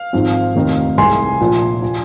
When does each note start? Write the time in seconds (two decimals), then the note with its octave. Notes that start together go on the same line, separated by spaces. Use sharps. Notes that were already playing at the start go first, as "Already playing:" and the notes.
Already playing: F5
0.13 G#1 G#2 F3 C4
0.55 F1 D#2 D#3 C4 D#4
0.98 C2 C3 G#3 G#5 C6
1.40 A#1 A#2 F3
1.82 F3